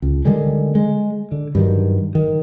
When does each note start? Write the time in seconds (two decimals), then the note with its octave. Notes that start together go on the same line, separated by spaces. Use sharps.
0.02 C#2
0.25 D3 D#3 G3 G#3
0.75 G#3
1.32 D3
1.55 G2 D#3 F#3
2.15 D#3